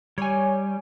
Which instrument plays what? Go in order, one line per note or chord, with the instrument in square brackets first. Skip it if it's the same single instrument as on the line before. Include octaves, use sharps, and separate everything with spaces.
[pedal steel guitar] G3 [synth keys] C#5 G#5